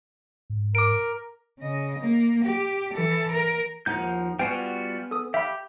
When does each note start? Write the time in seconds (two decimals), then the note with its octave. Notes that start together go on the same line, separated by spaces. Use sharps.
0.50 G#2
0.75 A#4 D6 D7
1.59 C#3 D#5
1.99 A#3
2.45 G4
2.94 E3 A4
3.32 A#4
3.86 D#2 F3 D#4 F#5 G6
4.39 G3 B3 F4 F#4 G5 G#5 C7
5.11 A4 D#6
5.34 G4 E5 F5 B5